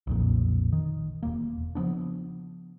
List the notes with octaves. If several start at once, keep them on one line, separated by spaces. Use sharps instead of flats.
B1 F2 A#2
D#3
E1 A#3
C#3 F3 B3 D4